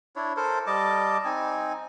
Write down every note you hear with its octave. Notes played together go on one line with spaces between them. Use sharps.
D4 E4 C#5
A4 A#4 C5
G3 D#5 A5 D6
C4 D#4 G#5